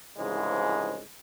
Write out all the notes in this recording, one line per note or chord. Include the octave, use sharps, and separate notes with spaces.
C2 G#2 C#3 E3 F3 G#3